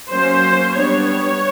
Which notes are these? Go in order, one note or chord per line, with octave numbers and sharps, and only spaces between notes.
F#3 A#3 C#4 C5
G3 B3 D4 C#5